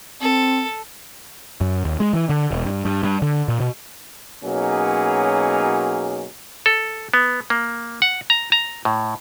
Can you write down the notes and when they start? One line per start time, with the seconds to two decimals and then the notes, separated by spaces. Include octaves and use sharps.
0.21 C4 A4
1.61 F#2
1.85 D#2
2.00 G#3
2.13 E3
2.29 D3
2.51 E1
2.65 G2
2.85 G2
3.03 G2
3.22 D3
3.48 A#2
3.60 B2
4.44 B2 F#3 A#3 C#4 D#4 G#4
6.66 A4
7.14 B3
7.50 A#3
8.02 F#5
8.30 A#5
8.52 A#5
8.85 A2